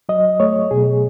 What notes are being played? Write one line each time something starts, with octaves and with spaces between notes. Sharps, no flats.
F#3 D#5
A3 C#5
B2 G#4